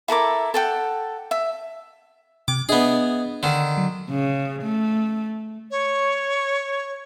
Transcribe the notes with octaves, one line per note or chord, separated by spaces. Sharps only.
E4 A4 A#4 D6
A4 F#5 G5
E5
C3 D6
B3 D4 G#4 D#5 E5
D3 D#3
F#3
C#3
A3
C#5